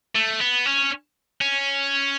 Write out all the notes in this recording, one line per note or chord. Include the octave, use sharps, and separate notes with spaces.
A3
B3
C#4
C#4